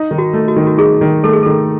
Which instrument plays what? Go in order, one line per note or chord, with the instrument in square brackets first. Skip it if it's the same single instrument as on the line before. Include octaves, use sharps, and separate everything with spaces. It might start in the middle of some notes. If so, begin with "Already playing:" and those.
Already playing: [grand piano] D#4
D#3
[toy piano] F#4
[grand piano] A3
[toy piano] F#4
[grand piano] D#3
[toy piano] F#4
[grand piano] D#4 [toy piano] G#4
[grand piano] D#3
[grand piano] A3 [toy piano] A4
[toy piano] G#4
[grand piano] D#3 [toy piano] A4